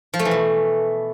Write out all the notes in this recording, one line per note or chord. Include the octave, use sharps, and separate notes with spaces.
F3
A3
E3
B2